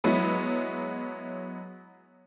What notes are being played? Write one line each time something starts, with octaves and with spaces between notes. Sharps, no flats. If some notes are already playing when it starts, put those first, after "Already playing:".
F#3 G#3 B3 E4